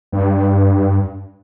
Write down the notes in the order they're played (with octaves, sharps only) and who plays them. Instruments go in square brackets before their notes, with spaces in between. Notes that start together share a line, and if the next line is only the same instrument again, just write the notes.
[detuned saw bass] G2